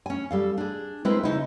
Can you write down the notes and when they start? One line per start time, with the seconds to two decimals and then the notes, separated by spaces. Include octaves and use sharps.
0.06 C#4 G#5
0.31 G3 A4 F5
0.58 D4 G#4
1.05 G#3 C4 E4 A#4 B4
1.23 C#3 D#4 E4